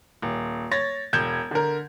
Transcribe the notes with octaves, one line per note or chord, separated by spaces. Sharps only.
D#1
C#5 A6 A#6
E1 G6 G#6 E7
D3 A#4